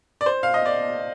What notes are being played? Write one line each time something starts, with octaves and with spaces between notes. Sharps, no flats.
D5
C5
F5
D#5
D5